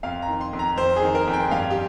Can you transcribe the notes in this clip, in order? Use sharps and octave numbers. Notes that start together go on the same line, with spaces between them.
F2 F5
A#5
D#3
C6
F2
A#5
F2 C5
G#4
D#3
A#4
F2
G5
G2 F5
G4